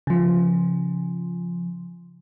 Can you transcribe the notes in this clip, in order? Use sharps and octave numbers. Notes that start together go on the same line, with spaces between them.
C#3 F3